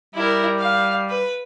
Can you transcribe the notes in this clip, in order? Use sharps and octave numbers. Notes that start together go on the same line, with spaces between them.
G3 E4 A#4
F5
B4